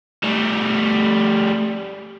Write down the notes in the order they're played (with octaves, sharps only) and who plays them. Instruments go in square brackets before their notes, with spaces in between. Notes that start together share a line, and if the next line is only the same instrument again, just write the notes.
[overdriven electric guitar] G3 A3